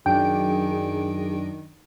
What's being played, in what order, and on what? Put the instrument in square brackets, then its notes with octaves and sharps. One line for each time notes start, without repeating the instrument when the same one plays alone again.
[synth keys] F#2 D4 D7 [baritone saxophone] D#3 [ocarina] G#4 [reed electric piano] G5